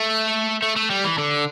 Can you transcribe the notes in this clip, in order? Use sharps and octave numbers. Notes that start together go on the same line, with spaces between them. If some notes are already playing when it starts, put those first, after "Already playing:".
Already playing: A3
A3
A3
G3
E3
D3